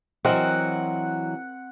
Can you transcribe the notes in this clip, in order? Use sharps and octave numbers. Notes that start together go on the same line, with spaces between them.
E3 F#3 C4 A#4 D#5 F#5